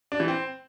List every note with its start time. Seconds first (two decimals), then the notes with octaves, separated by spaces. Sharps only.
0.12 D4
0.20 E3
0.28 C4